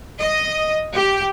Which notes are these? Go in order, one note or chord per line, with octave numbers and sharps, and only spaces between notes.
D#5
G4